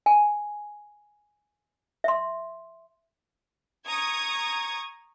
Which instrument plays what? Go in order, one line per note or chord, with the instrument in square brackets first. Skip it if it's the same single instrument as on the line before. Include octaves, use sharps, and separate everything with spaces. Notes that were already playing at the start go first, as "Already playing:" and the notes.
[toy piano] G#5
E5 C6
[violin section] A#5 C#6 D#6 G#6